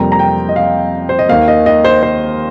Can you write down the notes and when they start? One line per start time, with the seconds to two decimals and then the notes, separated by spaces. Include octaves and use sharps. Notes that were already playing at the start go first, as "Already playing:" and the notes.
Already playing: F2 C3 G3 A#3 A#5
0.12 A#5
0.19 G5
0.49 D#5
0.56 F5
1.09 C5
1.19 D#5
1.28 D#2 D#3 A#3 F5
1.48 D#5
1.66 D#5
1.85 C5
2.03 C5